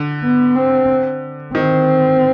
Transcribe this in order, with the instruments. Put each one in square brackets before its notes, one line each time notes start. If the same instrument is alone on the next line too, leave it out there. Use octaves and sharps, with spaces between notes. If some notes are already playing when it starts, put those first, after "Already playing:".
Already playing: [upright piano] D3
[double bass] B3
C4
[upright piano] D#3 [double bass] C4